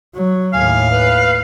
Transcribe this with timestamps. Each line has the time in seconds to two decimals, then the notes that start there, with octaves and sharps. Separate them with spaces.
0.14 F#3
0.53 D#2 A2 F5 G#5
0.91 B4